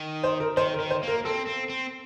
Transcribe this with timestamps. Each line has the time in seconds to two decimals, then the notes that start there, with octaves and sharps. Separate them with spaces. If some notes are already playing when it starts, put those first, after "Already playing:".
Already playing: D#3
0.23 C5
0.40 A#4
0.57 D#3 C5
0.74 A#4
0.80 D#3
0.90 C5
1.03 A#3 A#4
1.25 C4 A4
1.47 C4
1.69 C4